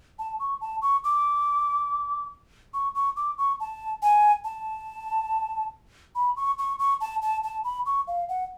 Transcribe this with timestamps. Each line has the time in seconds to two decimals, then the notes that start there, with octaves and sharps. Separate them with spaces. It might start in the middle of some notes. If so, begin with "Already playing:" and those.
0.19 A5
0.40 C#6
0.61 A5
0.82 C#6
1.04 D6
2.74 C#6
2.95 C#6
3.16 D6
3.38 C#6
3.60 A5
4.02 G#5
4.44 A5
6.15 B5
6.37 C#6
6.59 C#6
6.79 C#6
7.01 A5
7.22 A5
7.44 A5
7.64 B5
7.86 C#6
8.08 F5
8.29 F#5